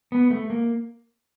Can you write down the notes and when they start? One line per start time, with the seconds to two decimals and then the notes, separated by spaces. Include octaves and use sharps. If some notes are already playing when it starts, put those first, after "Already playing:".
0.12 B3
0.30 A3
0.50 A#3